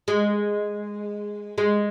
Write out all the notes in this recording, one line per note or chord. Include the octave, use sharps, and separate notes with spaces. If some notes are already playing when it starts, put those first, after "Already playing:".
G#3
G#3